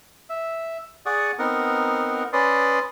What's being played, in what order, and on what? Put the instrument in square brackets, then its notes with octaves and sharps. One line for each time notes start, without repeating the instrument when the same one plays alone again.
[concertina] E5
G#4 D5 F#5 C#6 D#6
B3 C4 D#4 A#4 F#5
C#4 B4 D5 C6 D#6